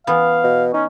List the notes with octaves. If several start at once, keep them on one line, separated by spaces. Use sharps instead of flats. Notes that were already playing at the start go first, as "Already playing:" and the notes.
E3 B3 F5
B2
C#4 D#4